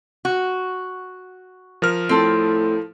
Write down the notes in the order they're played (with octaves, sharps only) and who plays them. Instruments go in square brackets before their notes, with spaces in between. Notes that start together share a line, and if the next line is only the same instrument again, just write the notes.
[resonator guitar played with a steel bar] F#4
[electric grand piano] F3 A#4 F6
[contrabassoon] A2 [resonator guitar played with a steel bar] C4 A4